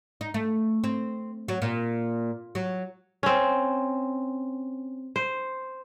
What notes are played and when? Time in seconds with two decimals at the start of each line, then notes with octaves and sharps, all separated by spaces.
0.21 D#4
0.34 A3
0.84 C4
1.48 F#3
1.62 A#2
2.55 F#3
3.23 C4 C#4
5.16 C5